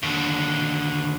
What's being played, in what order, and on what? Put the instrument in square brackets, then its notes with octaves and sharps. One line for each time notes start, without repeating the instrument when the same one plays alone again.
[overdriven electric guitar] D#2 D3